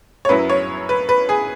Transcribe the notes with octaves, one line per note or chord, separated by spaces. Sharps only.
C#5
F#2 F#3 E4 B4
C#5
B4
B4
G#4